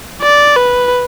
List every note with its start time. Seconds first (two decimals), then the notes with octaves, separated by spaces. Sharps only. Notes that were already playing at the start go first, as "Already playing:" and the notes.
0.22 D5
0.56 B4